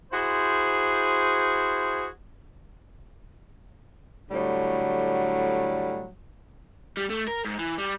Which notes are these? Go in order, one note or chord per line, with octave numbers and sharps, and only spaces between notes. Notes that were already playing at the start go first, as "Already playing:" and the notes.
E4 F#4 G#4 C5
A2 D3 F#3 G3
G3
A3
A#4
G#2
E3
G3